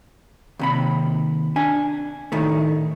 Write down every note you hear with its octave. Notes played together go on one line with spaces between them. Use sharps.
D#2 C3 B5
D4 G#5
A2 D#3 A3